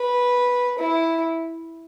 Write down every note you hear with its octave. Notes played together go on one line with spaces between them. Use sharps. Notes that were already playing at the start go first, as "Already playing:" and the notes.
Already playing: B4
E4